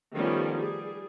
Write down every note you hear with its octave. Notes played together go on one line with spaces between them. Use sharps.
D#3 F3 G3 A3 B3 C#4
G3 G#4